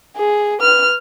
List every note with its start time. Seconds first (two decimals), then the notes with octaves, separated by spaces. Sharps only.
0.17 G#4
0.61 B4 F6